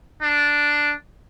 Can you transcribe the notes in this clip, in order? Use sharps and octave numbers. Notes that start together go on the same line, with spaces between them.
D4